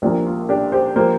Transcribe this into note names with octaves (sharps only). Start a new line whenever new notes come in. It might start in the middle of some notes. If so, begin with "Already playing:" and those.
A#1 A#2 F3 A#3 D4 G4
F4
D4 G4
G4 C5
F3 A#3 G4 C5